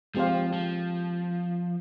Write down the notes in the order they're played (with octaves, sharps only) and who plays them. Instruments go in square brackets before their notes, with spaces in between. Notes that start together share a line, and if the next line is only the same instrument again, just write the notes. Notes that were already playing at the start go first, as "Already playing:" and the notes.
[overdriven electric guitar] F3 [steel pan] G#3 C4 G4 C5 F5
[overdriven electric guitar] F3